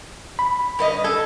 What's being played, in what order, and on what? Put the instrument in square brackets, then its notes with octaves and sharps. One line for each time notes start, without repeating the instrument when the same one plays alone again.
[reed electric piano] B5
[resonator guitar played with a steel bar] G2 B4 D#5
[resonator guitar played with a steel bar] A4 [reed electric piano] G#6